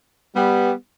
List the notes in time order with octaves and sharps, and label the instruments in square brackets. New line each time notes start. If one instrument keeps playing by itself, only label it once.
[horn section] G3 B3